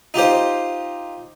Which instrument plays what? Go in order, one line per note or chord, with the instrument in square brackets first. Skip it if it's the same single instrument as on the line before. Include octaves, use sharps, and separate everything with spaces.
[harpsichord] D#4 F4 G4 C5